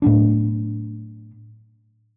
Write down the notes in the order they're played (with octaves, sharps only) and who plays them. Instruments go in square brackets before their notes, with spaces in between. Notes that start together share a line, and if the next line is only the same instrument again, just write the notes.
[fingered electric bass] A2 F#3 B3 D4